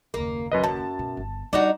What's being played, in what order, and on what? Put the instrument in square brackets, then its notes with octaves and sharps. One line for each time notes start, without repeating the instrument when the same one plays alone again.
[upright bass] F#1 D#2 [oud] A#3
[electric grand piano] F#2 B4 D#5
[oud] F#2 [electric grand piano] A5
[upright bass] B2
G1
[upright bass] G3 [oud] D4 D#4 F#4